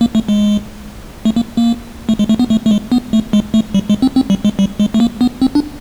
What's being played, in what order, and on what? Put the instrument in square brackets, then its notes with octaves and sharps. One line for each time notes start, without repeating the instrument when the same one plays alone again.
[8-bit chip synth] A#3
A3
G#3
A3
A#3
A#3
A3
G#3
A3
B3
A3
A3
G#3
B3
A3
G#3
A3
G3
G#3
C4
C4
G3
G#3
G3
G#3
A3
A#3
B3
C4
D4